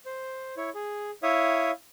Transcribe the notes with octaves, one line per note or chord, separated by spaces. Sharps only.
C5
E4 C#5
G#4
E4 C#5 E5 F5 D#6